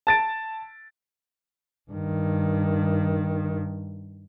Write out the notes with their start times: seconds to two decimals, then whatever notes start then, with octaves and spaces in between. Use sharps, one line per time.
0.07 A5 A6 D7
1.91 G2 D#3